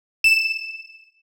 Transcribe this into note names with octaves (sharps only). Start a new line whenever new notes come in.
E7